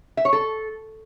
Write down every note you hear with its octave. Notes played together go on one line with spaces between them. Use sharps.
E5
C#5
A4